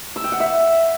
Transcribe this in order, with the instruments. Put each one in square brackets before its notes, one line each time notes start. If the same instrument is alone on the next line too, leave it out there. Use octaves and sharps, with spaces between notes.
[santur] E6
G5
F#5
E5